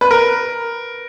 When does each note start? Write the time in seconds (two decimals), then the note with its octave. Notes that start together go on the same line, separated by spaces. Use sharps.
0.01 B4
0.11 A#4